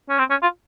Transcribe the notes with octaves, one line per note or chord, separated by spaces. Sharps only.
C#4
C4
C#4
F4